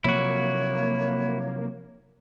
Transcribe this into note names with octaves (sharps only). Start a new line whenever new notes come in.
C3 F3 F#3 A#3 E4 F#4 C#5